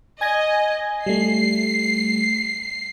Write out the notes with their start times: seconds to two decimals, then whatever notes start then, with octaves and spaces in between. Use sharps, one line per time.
0.21 D#5 G#5 G#6 A#6
1.06 G3 A3 C7